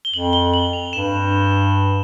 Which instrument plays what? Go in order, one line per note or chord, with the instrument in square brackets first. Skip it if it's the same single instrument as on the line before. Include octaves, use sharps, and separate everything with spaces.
[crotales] G7
[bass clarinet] F2 [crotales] F#7
[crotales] G7
F#7
F7
[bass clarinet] G2 [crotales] E7